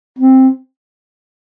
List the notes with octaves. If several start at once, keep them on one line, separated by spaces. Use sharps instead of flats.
C4